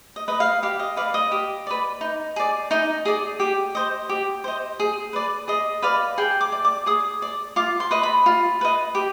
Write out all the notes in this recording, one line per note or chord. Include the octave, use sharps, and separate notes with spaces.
D#5
B4 D#5
F5
G4 F5
D#5
B4 D5 F5
D#5
G4
B4 D5
D#4
G#4 D5
D#4 D#5
G#4 D5
G4
C5 D#5
G4
C5 D#5
G#4
B4 D5
G#4 D#5
B4 D5 F5
G#4 G5
D6
D5
D6
G#4 D#6
D5
F4 D6
C6
B4 D#5
B5
F4
B4 D#5
G4